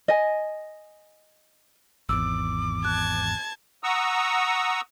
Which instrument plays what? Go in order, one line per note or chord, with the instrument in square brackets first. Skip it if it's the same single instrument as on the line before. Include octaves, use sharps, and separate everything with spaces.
[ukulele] D#5 G#5
[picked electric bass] G#1 E2 [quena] D6 [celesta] E6
[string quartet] A5 G#6 [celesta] F#6
[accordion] F#5 A#5 C#6 D#6 E6